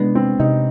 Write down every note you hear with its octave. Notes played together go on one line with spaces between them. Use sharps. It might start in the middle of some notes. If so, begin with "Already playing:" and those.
Already playing: C3 G#3 B3 D4
C4
C3 D#4